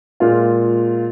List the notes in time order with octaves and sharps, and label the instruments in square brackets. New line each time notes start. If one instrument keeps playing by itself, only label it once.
[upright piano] A#2 G#3 F4